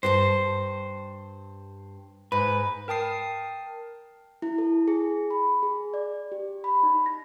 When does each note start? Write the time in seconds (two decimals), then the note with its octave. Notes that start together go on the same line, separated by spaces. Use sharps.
0.03 G2 G4 C5 A5
2.32 G#2 B4
2.88 A#4 G5 A5 D#6 C7
4.42 E4
4.58 A4
4.88 G#4
5.30 B5
5.63 G#4
5.94 D5
6.32 G4
6.64 B5
6.83 D#4
7.06 A#6